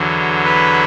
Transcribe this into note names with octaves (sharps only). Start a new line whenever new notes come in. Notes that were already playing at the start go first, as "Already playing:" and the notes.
Already playing: E2 D3 F#3
B4